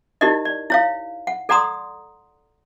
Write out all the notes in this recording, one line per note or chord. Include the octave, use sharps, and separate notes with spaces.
D#4 E4 G4 A#4 D5 D#5
D5
E4 C#5 F5
F#5
A4 D5 F#5 A#5 C6 D#6